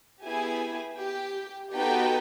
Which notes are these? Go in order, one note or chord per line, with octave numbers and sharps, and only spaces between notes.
B3 E4 G4 G#4 G#5
G4 G5
B3 D#4 F#4 G4 A4 G5